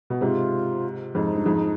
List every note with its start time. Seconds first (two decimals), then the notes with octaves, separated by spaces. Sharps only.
0.10 B2
0.21 G#2 C3 F4
1.15 F2 G#2 D#4
1.35 G2
1.46 F2 G#2